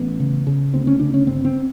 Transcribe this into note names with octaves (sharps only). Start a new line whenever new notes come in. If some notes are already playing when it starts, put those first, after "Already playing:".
Already playing: A1 B3
C#3
C#3
D2 C4
C#4
C#3 D4
C#4
G1 C4
C4